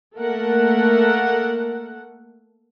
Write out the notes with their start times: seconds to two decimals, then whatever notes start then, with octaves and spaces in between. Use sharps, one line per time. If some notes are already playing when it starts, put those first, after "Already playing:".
0.17 A3 A#3 A4 A#4 F#5